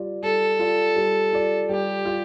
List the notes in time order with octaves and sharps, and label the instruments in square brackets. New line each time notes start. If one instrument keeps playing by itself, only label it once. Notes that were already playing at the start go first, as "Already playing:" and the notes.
Already playing: [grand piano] G3 F4 D5
[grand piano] G3 [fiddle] A4
[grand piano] F4 D5
G3
F4 D5
[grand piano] G3 [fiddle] G4
[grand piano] F4